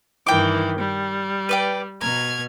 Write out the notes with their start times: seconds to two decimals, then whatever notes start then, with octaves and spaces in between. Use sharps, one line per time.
0.27 G2 D#3 E3 G5 D6
0.78 G3
1.49 B4 D5 G5
2.01 B2 A#5 F6 G#6